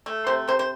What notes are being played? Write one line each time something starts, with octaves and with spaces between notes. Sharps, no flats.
A3
C3 C5
C3 C5
C5